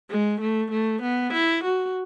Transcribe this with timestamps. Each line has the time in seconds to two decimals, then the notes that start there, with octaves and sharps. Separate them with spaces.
0.10 G#3
0.41 A3
0.71 A3
1.02 B3
1.33 E4
1.64 F#4